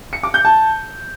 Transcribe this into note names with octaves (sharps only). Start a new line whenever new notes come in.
C#7
D6
G6
A5